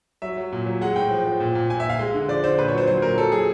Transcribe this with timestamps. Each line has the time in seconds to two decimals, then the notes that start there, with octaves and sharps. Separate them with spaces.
0.22 F#3 E5
0.38 F#3
0.52 A#2
0.66 F#3
0.81 G#3 F#5
0.96 A2 G5
1.11 F3
1.26 F3
1.40 A#2
1.55 A#2
1.70 A#2 G#5
1.80 E5
1.84 A#2
1.90 F5
1.99 G#3
2.14 D3
2.28 F3 D5
2.44 D3 C5
2.58 A#2 B4
2.68 C#5
2.73 F#3 C5
2.87 F#3 C5
3.02 A#2 A#4
3.18 F#3 A4
3.32 F#3 G#4